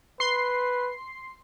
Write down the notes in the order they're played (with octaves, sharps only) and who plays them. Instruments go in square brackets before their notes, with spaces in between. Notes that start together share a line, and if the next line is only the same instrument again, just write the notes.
[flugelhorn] B4 [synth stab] C6 C7